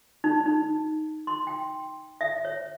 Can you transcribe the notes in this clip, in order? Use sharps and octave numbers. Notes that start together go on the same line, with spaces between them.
D#4
D#4
C6
G5
E5
C#5